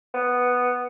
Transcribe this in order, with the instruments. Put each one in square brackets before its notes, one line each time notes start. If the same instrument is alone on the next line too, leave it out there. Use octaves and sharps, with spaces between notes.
[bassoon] B3